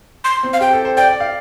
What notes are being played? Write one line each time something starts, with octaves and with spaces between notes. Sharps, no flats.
C6
C4
F5
G4 G5
A4
C5
D5 G5
D5
F5